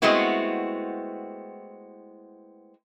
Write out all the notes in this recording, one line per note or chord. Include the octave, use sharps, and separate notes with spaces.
G#3 A3 B3 C4 E4 F#4